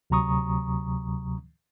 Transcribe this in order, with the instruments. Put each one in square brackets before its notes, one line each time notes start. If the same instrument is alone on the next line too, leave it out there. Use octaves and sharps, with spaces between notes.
[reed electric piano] D2 C3 F#3 A#5 C#6 D#6